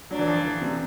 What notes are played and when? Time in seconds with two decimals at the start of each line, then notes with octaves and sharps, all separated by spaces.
0.10 F#3 D4
0.19 E3
0.27 F3
0.45 E3
0.62 C3